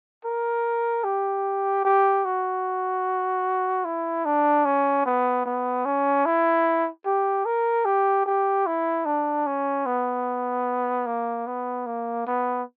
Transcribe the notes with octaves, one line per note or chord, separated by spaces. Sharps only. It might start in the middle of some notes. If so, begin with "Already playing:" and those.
A#4
G4
G4
F#4
E4
D4
C#4
B3
B3
C#4
E4
G4
A#4
G4
G4
E4
D4
C#4
B3
A#3
B3
A#3
B3